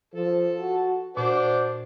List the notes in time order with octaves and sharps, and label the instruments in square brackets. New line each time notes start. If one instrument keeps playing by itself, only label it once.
[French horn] F3 [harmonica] A4 A5
[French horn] F#4
[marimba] A#2 [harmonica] D4 C5 D5 [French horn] F#4